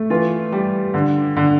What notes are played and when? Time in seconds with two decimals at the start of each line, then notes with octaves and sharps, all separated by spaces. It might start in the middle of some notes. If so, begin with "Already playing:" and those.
Already playing: A3
0.10 E3 F4
0.52 G3
0.94 D3
1.36 D3